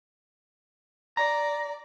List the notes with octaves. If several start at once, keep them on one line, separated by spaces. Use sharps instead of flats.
D5 A#5